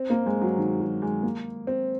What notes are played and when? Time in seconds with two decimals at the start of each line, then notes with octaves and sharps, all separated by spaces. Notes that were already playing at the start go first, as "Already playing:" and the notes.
Already playing: C4
0.10 A#3
0.26 G#3
0.41 F#3
0.58 D#3
0.80 F#3
1.02 G#3
1.23 A#3
1.67 C4